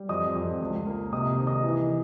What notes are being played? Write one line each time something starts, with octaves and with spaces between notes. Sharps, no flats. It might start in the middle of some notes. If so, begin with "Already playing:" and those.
Already playing: G3
F2 D#5 D#6
F2
C#2
A#3
C3 D#5 D#6
D#3
D#5 D#6
E3